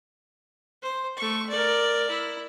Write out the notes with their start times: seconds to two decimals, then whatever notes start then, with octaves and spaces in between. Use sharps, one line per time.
0.82 C5
1.17 A3 C#6
1.50 A#4 D5
2.10 E4